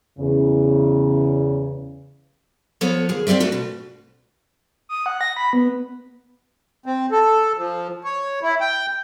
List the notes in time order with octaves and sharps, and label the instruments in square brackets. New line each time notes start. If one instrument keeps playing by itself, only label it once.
[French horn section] E2 C#3
[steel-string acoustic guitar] F3 B3 A4 C#5
D#2 G#4
C4 G4 A#4 D5 E5
A3 F#4 A4
B2
[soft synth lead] D#6
F#5
A#6
B5
B3
[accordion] C4
A4
F3
C#5
E4
G5